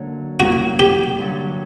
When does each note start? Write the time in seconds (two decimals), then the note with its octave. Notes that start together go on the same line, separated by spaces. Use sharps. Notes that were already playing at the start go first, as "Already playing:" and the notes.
Already playing: F#2 D3 F#3 A#3
0.40 G2 F#3 A#3 C#4 E4 F#4
0.79 G4
1.19 G2 D3 F#3